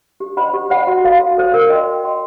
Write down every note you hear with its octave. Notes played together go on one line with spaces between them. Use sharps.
G4
C5 D#5 F#5 B5
G4
C5 D#5 F#5 B5
F#4
A4 C5 F5
F#4
A4 C5 F5
A#4
D#5 G5 C6
A#4
D#5 G5 C6